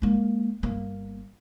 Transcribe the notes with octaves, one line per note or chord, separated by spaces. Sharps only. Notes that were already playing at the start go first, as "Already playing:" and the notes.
G#3 A#3
G1 A#3